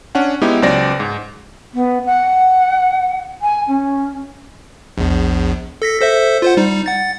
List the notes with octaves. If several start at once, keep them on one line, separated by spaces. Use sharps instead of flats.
C#4 D4 F#5
G#3 B3 D#4 E4 G4
C#2 F#3 C#4 C5 D5 A#6
G#2
B3
F#5
G#5
C#4
A#1 E2
A4 A#6 B6
A4 C5 E5
F4 C5 F#5
G3 D#4
F#5 A6